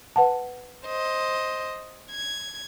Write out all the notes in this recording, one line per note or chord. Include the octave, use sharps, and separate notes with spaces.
B4 F#5 A5
C5 D#5
G#6